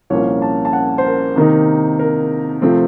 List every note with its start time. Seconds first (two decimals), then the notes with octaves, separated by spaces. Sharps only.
0.10 C2 A#2 F3 A#3 C#4 C#5
0.42 A5
0.65 A5
0.73 F#5
0.98 C5
1.05 A#4
1.36 C3 D#3 A#3 D#4
1.99 A#4
2.62 C3 F3 A3 C4